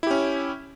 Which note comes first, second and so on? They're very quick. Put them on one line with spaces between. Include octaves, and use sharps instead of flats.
E4 G4 C#4